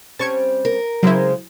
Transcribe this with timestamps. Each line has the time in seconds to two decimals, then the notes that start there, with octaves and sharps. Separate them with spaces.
0.19 G3 C4 C#4 A5 C#6 G#6
0.65 A#4
1.03 C#3 F#3 G#3 C4 E4